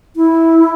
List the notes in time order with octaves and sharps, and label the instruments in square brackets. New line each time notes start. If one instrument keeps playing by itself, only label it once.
[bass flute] E4